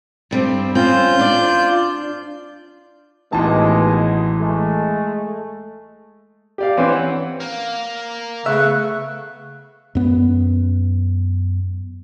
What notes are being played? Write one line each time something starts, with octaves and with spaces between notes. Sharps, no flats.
G2 G3 C4
C4 C#4 F4 G6
D4 D5
A1 D#2 B2 E3 G#3 A5
G#3 A3
G4 D5 F5
E3 C4 C#4
F#5
A#3
C#3 A3 B3 E5 C#6 F#6
F#2 B3